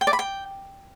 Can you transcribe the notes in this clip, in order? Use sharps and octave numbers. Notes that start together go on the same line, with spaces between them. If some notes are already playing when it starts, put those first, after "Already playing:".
G5
D5
B5
G5